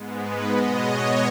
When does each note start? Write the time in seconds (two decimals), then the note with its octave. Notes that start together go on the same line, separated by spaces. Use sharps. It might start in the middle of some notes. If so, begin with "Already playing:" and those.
Already playing: G#2 G#3 B3
0.22 B4
0.51 B2 G#3 B3 D#5
0.82 C#5